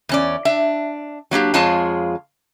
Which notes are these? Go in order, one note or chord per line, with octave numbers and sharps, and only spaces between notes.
E2 C#4 D5
D4 E5
F#3 A#3 D4 G4
F2 G#3 F4 G#4 C#5 A5